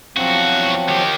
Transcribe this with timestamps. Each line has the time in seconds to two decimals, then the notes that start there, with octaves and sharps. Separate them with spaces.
0.17 E2 F3 F#3 C4 F#4
0.88 D#3 G4